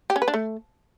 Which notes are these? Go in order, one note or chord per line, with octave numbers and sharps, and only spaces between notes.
G4
C#4
B4
D4
A3